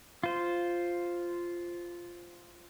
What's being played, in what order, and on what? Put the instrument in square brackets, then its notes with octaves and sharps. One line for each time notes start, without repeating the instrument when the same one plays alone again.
[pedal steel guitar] F4 C5